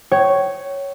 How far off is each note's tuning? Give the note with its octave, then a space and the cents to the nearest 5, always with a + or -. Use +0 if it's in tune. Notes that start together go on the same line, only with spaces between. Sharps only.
C#5 +0 G5 -35